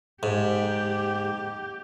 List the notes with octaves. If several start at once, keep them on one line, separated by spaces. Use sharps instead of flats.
G#2 G4